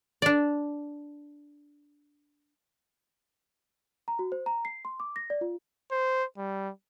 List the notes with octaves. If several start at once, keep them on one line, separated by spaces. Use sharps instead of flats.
D4 D5
A#5
F#4
C5
A#5
C7
C6
D6
A#6
D5
F4
C5
G3